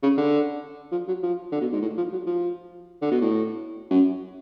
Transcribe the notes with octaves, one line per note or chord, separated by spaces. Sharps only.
C#3
D3
F3
F#3
F3
D3
B2
G#2
A2
F3
F#3
F3
D3
B2
A2
F#2